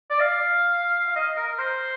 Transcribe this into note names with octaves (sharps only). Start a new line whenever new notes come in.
D5
F5
F5
D#5
A#4
A#4
C5